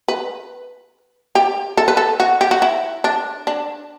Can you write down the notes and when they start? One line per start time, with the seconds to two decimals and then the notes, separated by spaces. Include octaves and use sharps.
0.08 B4
1.35 G4
1.77 A4
1.88 B4
1.97 A4
2.20 F#4
2.41 G4
2.51 F#4
2.62 E4
3.04 D4
3.47 D4